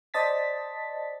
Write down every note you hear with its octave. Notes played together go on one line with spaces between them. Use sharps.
C5 D5 D#5 A5 A6 B6